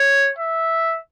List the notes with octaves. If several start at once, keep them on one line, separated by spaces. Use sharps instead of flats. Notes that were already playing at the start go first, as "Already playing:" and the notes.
Already playing: C#5
E5